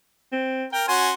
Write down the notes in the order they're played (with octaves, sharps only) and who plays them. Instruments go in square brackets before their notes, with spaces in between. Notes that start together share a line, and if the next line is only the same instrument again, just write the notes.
[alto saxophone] C4
[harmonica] A#4 [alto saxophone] G5
[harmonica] C#4 F#4 C6 [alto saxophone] G#5